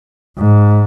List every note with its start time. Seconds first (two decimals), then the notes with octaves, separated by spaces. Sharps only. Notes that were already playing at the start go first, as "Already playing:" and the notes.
0.38 G#2